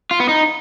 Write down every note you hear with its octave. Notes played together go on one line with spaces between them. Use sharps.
F4
B3
D#4